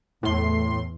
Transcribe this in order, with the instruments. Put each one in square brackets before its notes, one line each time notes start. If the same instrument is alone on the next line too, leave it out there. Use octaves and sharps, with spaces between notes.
[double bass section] E2 [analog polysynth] A2 C6